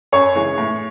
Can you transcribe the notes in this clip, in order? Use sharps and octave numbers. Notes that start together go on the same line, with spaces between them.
F#2 C#5
C#3 E3 G#3
A2